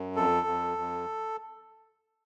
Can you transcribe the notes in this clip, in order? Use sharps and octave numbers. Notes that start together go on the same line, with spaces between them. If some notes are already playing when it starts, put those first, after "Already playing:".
Already playing: F#2
F2 A4
F2
F2